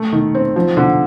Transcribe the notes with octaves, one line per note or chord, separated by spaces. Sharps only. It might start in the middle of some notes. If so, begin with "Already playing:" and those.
Already playing: A3
D#3
C4
F3
D3